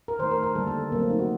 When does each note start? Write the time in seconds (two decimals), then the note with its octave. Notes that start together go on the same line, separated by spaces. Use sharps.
0.08 A#4
0.19 D#3 A3 C5
0.31 A#4
0.43 A#4
0.55 D3 G3 A#3 A4
0.67 A4
0.92 C3 F#3 A3 A#3
1.00 C4
1.10 D#4
1.19 F#4